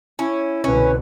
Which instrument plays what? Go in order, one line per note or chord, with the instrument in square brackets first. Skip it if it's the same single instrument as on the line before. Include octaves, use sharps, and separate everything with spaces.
[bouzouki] C#4 [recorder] E4
[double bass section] C2 B2 D3 [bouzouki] C#4 [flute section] B4